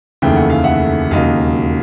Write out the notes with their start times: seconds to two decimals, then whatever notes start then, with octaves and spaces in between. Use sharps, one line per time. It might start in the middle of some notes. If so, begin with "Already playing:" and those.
0.22 F1 D#2 C#3 E3 A3 G5
0.35 F#5
0.50 F5
0.64 E5 F#5
1.11 E1 D#2 C#3 F#3 D#5 F5